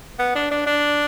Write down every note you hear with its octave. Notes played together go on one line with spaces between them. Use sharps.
B3
D4
D4
D4